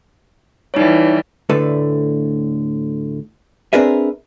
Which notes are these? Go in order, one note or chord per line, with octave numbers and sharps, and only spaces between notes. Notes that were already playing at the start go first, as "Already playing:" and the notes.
E3 G3 D#4 C#5
D2 A2 D3 A4 B4
C4 D4 G#4 A#4 B4 E5